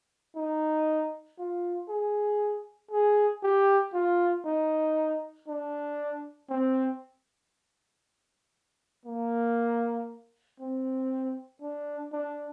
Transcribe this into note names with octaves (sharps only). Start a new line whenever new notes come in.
D#4
F4
G#4
G#4
G4
F4
D#4
D4
C4
A#3
C4
D4
D4